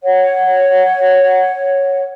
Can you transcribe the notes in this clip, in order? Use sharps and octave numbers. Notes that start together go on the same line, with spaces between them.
C#5 F#5